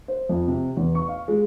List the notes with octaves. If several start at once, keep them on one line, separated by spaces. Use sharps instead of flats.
C5
F2
C3
E2
C#6
F5
G#3